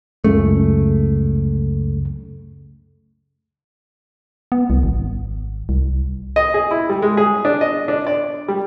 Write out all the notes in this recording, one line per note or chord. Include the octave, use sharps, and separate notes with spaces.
C#2 F#2 C#3 A3
B3
C2
G#1
C2
D#5
G#4
E4
G3
G#3
G#4
D4
D#5
D4
D5
G3